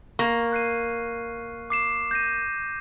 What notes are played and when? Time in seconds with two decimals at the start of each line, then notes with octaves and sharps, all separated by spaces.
0.19 A#3 C#6 F6
0.52 F#6 C7 D#7
1.70 D6 C7 E7
2.11 G6 A#6 D#7